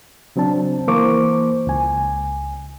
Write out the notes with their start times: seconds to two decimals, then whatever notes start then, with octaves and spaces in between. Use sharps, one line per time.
0.36 C#3 F#3 C4 D4 A5
0.88 E3 A#3 C5 C#6 D6
1.67 C#2 G#5